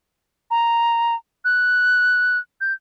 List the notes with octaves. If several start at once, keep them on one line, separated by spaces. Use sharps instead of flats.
A#5
F#6
G6